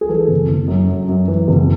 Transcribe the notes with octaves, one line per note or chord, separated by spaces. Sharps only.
G#4
E3 A4
F#1
F#1
F#2
F#2
F#2
E3
F#1